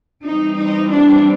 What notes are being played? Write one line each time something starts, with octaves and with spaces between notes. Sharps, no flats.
E3 G3 C4 D#4
D#4
D4